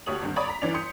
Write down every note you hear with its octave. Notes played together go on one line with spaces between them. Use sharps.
D2 G4 C#5 D#6 F#7
G#1 G2
C#5 D5 A#5 B5 D#6
A#5 B6
G1 E3 C#4 D4 D5 F7
C6 D#6 G6 C#7